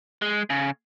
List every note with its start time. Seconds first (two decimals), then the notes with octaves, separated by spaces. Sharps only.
0.22 G#3
0.50 C#3